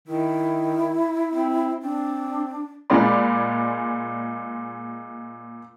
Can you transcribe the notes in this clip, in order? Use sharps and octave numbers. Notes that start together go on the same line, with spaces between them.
D#3 E4
C4
C4 D4
A#2 G#3 D5 B5